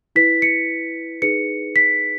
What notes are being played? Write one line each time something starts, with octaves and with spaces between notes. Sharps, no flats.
E4 B4 B6
C#7
D#4 G#4 B4 C#7
B6